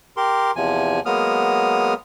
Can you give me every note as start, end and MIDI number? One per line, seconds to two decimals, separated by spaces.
0.17 0.51 67
0.17 0.51 70
0.17 0.51 84
0.56 1.00 40
0.56 1.00 48
0.56 1.00 53
0.56 1.00 80
1.06 1.94 54
1.06 1.94 56
1.06 1.94 58
1.06 1.94 59
1.06 1.94 87
1.06 1.94 89